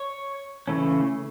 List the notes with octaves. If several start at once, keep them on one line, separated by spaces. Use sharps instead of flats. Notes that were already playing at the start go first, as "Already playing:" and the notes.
Already playing: C#5
C#3 E3 A3 C#4